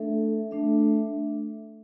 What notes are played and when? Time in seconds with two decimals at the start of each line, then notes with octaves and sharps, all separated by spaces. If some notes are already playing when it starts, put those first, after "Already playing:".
Already playing: A3 D4 A4 E5
0.51 A3 D4 A4 E5